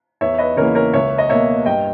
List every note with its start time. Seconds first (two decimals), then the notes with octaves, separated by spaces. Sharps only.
0.21 E2 C#5 E5
0.39 B4 D#5
0.57 C#3 E3 A#3 A#4 C#5
0.75 A#4 C#5
0.93 C#2 C#5 E5
1.18 D#5
1.29 B2 A#3 C#5 E5
1.66 G2 D#5 G5